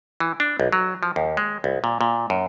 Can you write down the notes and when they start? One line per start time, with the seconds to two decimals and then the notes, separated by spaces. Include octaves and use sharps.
0.20 E3
0.40 D4
0.60 B1
0.73 F#3
1.03 F3
1.16 D#2
1.37 G#3
1.64 C2
1.84 A#2
2.01 A#2
2.30 F#2